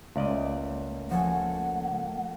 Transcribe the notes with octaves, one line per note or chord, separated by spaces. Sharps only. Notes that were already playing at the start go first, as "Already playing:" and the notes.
C#2 A3 A#3 D5 D#5
F3 A4 F#5 G#5